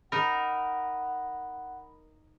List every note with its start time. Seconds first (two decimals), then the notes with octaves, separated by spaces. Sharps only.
0.12 D#4 A#4 F#5 B5